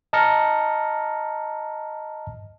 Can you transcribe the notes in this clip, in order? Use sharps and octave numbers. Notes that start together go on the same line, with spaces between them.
D#5 A5 A#5 F6 A#6 C#7